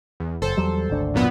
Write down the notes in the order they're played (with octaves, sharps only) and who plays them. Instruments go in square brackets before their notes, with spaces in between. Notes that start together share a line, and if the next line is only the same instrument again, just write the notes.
[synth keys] E2
[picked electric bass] F#1 [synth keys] A4 C5
[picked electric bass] E2 F#3 G3
G#1 D2 D4
[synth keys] F#2 A#2 B3